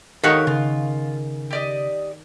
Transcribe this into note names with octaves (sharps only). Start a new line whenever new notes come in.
D#3 D#4 G4 A4 A#4 C#5 F5 F#5
C#3 F4
G4 D5 D#5